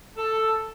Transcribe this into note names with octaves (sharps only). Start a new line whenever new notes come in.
A4